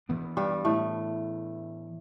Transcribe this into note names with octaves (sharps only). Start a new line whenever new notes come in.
E3 B3 D4
G2 G3
A2 A3